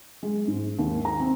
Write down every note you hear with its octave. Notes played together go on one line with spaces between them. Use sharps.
G#3
G#2
D#2
A#5
C4